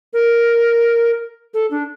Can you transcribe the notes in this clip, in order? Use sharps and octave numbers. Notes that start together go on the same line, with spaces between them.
A#4
A4
D4